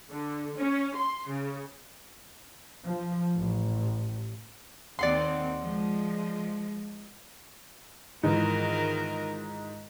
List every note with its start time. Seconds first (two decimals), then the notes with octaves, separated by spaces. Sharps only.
0.10 D3
0.57 C#4
0.95 C6
1.28 C#3
2.85 F3
3.36 A1
4.99 D#2 D#3 C4 D5 F#5 C6
5.59 F3 G#3
8.23 G#2 D#3 E3 F4 A#4